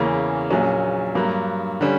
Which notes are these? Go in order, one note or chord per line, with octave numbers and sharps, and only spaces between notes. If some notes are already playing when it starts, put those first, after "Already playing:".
Already playing: E2 C#3 E3 A#3 C#4
A#1 A#2 F#3 C#4
G2 F#3 A#3
D3 G3 C#4